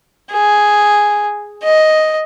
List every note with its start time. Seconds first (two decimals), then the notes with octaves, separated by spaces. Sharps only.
0.31 G#4
1.63 D#5